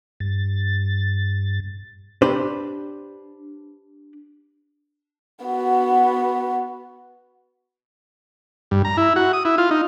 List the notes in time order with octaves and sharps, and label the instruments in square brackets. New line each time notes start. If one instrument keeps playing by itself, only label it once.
[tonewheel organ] G2 A6
[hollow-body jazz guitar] D4 G4 B4 C5
[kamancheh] B3 F#4
[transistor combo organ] G2
A#5
E4
F#4
D#6
E4
F4
D#4